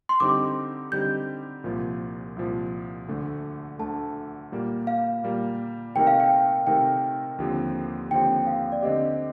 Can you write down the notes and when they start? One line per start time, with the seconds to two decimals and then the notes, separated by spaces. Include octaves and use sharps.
0.09 C6
0.20 D3 G3 C4 D#4 G4 D6
0.92 D3 G3 C4 D#4 G4 G6
1.64 C2 A#2 F3
2.37 C2 A#2 F3
3.08 D2 D3 A3
3.79 D2 D3 A3 A5
4.52 A#2 G3 A#3
4.87 F5
5.24 A#2 G3 A#3
5.95 C3 D#3 A3 D#4 A#4 G5
6.07 F5
6.20 G5
6.67 C3 D#3 A3 D#4 A#4 G5
7.39 D#2 D3 F3 C4 G4
8.11 D#2 D3 F3 C4 G4 G5
8.47 F5
8.72 D5
8.83 D3 A3 C4 G4 D#5